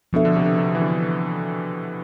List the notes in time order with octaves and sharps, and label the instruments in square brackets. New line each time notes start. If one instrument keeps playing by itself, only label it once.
[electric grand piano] B2 [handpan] F3 B3 D4 A4 E5
[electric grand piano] D3
C3
C3
E3
D3